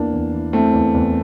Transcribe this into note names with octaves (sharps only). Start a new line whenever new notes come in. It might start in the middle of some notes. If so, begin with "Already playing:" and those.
Already playing: E2 E3 A#3 D4
E2
E3
E3 A3 C4
E2
E2